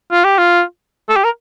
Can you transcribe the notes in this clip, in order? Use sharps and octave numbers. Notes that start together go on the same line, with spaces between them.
F4
G4
F4
A4
G4
A#4